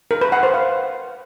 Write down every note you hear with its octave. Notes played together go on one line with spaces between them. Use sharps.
A#4
B4
F#5
C5
F5